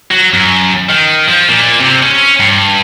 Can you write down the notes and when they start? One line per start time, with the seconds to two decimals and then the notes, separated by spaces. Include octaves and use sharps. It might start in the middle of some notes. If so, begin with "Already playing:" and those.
0.11 F#3
0.33 F#2
0.89 D#3
1.28 F3
1.49 A#2
1.80 C3
2.03 C#4
2.40 G2